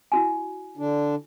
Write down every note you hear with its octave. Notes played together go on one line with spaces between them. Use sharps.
E4 F#4 G#5
D3 D4